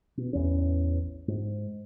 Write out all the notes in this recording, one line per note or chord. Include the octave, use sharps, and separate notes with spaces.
B2
A1 E2 E3 C#4
G#2